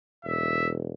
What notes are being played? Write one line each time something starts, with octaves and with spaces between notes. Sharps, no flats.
E1 E5